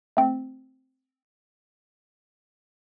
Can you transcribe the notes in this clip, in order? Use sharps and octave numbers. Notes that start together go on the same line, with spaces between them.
A3 C4